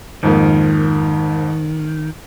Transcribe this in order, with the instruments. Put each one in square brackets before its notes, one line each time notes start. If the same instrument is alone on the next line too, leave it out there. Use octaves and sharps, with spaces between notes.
[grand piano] F2 G#2 A#3 [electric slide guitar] D#3